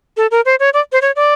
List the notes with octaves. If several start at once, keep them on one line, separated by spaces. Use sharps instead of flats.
A4
A#4
C5
C#5
D5
C5
C#5
D5